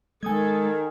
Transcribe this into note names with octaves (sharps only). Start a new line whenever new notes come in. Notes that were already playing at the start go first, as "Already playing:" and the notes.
D#3 G#3 A4 G#5 D#6 G#6